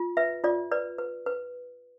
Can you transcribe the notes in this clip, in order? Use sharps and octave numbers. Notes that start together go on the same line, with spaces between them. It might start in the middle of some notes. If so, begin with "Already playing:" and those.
Already playing: F4
B4 E5
F4 D5
B4 D5
B4
B4